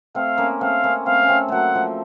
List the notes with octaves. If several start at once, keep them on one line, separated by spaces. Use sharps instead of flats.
A3 C4 F5
A#3 C#4
A3 C4 F5
A#3 C#4
A3 C4 F5
C#4
A3 C4
F#3 A3 A#3 F#5
F3 A3